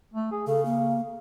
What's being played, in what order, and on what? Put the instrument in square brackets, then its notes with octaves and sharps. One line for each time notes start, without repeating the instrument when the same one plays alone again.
[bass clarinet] A3
G#4
[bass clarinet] C#3 [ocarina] A4
[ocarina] A#3